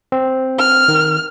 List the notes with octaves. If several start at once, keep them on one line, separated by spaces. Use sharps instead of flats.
C4
F6
D#3